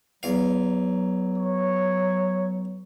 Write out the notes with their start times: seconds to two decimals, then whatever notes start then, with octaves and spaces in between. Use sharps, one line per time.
0.23 E2 F#3 F5
1.38 C#5